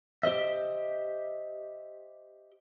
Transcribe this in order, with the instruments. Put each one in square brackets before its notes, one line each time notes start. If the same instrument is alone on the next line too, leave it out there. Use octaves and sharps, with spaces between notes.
[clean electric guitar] G4 C5 D#5 E5